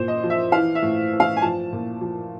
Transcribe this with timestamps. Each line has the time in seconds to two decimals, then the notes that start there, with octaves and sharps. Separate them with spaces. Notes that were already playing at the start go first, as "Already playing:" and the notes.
Already playing: A#2 C5
0.08 D#5
0.24 F3
0.30 E5
0.52 E3 F5
0.75 E5
0.82 A2
1.13 E3
1.20 F5
1.37 G#5
1.42 F3 A5
1.73 A#2
2.01 F3